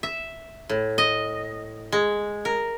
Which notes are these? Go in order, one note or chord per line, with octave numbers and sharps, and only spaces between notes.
E5
A2
D#5
G#3
A#4